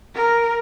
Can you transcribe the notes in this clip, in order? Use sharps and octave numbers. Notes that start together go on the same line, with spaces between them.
A#4